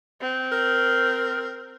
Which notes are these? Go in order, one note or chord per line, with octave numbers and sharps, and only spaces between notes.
C4
A#4